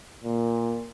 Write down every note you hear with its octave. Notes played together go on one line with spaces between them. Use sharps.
A#2